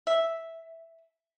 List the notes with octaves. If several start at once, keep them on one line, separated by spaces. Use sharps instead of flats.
E5